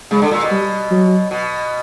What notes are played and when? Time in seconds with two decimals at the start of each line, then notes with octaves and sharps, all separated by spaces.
0.11 C#3 G#3
0.22 D3
0.31 A#2
0.42 B2
0.51 G3
0.91 F#3
1.31 B2